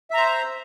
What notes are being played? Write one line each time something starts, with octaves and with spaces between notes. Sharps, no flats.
C5 E5 A#5